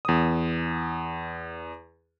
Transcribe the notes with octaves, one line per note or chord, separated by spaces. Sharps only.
E2 D#6